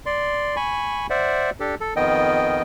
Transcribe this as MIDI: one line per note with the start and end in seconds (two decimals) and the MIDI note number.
0.06 0.56 74
0.06 0.56 84
0.56 1.07 80
0.56 1.07 83
0.56 1.07 85
1.10 1.50 72
1.10 1.50 74
1.10 1.50 76
1.10 1.50 78
1.60 1.75 62
1.60 1.75 67
1.60 1.75 69
1.81 1.94 69
1.96 2.62 41
1.96 2.62 51
1.96 2.62 59
1.96 2.62 75
1.96 2.62 79